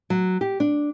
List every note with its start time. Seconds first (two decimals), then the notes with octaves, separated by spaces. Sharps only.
0.10 F#3
0.41 G4
0.60 D4